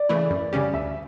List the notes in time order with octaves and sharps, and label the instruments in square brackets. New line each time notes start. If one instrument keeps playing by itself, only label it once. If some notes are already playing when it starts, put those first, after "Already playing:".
Already playing: [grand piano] D5
[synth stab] C#3 E3 A3 E4
F#2
C#3 G3 C#4 G4
[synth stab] D2 [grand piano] E5